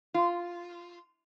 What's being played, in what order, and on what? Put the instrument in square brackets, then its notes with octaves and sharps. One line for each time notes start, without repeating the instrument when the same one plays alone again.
[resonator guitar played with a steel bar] F4